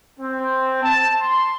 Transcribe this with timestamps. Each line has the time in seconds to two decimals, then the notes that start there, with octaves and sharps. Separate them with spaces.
0.20 C4
0.83 A5
1.21 C6